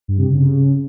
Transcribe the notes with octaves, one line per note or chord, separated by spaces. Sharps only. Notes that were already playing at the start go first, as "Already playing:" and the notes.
G2
C3
C#3